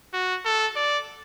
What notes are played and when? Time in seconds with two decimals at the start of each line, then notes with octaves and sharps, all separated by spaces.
0.13 F#4
0.45 A4
0.76 D5